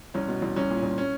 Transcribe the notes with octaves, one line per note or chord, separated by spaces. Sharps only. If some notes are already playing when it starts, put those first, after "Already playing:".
C2 C#4
B2
C2
C2 C#4
A#2
C2
C#4